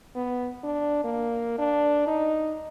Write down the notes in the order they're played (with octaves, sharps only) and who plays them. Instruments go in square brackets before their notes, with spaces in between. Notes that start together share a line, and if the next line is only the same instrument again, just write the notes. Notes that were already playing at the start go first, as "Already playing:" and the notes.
[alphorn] B3
D4
A#3
D4
D#4